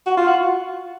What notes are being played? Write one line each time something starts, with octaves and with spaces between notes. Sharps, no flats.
F#4
F4
F#4